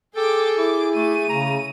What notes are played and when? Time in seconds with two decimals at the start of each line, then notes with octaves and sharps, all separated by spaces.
0.16 G#4 A4 G5 D6
0.58 E4 D6
0.96 A3 D#7
1.29 C#3 A#5